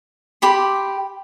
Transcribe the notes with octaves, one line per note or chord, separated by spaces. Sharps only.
G4 B5 C6